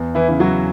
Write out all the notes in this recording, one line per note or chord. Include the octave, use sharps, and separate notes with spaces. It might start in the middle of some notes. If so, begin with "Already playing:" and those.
Already playing: E2
E3 E4
C#3 E3
F#3 F#4